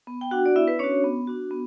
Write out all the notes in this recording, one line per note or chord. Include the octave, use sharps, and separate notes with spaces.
B3
G5
D4 F#4 F#5
D5
B3 E4 E5
B4
C#4 D4 F#4 C#5
B3
D4 F#4
B3